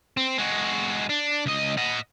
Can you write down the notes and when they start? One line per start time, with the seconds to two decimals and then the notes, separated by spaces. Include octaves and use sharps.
0.17 C4
0.38 G#3 F#4
1.10 D4
1.46 C#2 D#5
1.77 D#5 F#5